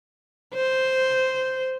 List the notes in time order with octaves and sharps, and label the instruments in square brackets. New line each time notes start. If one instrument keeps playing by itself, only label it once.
[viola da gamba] C5